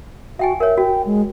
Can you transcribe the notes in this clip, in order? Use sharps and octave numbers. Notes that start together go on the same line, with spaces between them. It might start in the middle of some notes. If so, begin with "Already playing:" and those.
F#4 E5 G5 G#5
A#4 C#5 E5
F#4 G5
G#3